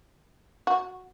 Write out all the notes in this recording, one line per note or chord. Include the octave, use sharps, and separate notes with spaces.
F#4